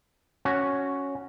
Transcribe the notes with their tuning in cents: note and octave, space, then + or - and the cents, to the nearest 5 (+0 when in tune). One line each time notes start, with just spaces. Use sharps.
C#4 +0 F#4 +0